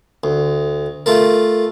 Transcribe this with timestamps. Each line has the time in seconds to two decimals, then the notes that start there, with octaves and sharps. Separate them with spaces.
0.24 D2
1.06 A3 F4 A#4